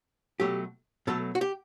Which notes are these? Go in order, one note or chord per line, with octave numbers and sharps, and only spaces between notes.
B2 F#3 A3 G4
B2 F#3 A3 A4
F#4
G4